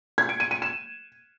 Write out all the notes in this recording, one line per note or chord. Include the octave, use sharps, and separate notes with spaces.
G#6
D7
D#7
D#7
E7